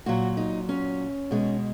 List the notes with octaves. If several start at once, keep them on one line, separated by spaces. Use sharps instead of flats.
A#2 F#3 F#4
D#4
C#4
B2 G#3